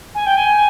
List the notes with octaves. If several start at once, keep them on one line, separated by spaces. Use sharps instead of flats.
G#5
G5
G#5